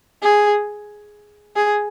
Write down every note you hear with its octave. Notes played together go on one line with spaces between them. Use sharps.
G#4
G#4